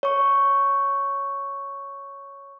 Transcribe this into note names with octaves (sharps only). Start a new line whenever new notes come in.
C#5 C#6